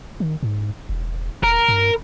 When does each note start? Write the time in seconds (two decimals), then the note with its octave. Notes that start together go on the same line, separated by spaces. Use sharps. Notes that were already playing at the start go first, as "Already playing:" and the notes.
0.20 D#3
0.43 G#2
0.89 E1
1.43 D#1 A#4
1.68 G2